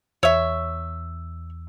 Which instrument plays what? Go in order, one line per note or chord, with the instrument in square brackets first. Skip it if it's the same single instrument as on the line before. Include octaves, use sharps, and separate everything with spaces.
[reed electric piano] E2 E6 [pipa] C#5 E5